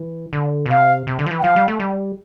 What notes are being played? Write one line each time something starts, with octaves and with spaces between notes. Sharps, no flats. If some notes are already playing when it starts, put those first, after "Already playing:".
Already playing: E3
D3
B2
C3 F5
C3
D3
F3
E3
G5
F3 F5
G3
A3
G3